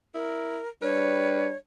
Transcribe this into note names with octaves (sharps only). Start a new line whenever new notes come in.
E4 A#4
G3 D4 B4 C#5